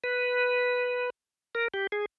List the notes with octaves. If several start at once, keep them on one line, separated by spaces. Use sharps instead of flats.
B4
A#4
G4
G#4